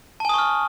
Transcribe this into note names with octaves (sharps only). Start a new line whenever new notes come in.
G#5 A5 C#6 D#6 F6